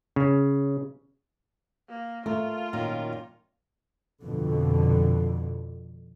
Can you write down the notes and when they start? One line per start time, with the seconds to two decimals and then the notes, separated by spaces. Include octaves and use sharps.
0.16 C#3
1.89 A#3
2.26 A3 F4 A4 A#4
2.73 F#2 A#2 D#3
4.23 F2 B2 D3